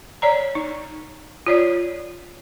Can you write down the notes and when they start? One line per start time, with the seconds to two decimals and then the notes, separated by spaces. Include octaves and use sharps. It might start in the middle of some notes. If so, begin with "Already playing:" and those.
0.22 C#5 D5 A#5
0.55 D#4
1.47 F4 C#5 D5